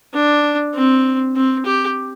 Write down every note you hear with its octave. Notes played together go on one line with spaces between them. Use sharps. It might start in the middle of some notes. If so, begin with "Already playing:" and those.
D4
C4
C4
G4